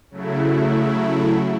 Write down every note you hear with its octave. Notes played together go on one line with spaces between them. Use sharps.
C#3 F#3 A3 E4